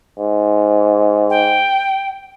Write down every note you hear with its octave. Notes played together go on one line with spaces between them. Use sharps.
G#2
G5